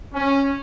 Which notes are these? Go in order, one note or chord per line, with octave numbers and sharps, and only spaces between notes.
C#4